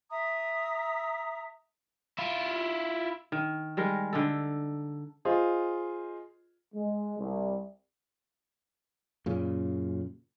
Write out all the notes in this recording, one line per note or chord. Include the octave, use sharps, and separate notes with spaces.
E5 A#5 D#6
E4 F4
D#3
G3 G#3 A#4
D3 D#4 A4
F4 G#4 C5 D#5
G#3
C2
F#2 A#2 C#3